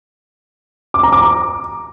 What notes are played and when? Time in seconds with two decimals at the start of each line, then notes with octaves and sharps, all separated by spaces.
0.94 D6
1.03 A#5
1.12 D6